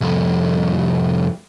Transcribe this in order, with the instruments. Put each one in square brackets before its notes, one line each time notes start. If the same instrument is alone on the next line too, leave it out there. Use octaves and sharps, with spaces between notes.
[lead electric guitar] C2 F2